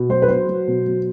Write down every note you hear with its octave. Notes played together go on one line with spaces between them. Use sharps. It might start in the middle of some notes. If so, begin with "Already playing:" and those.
Already playing: B2
F#3 C5
B4
F#3 C5
F#3
B2
F#3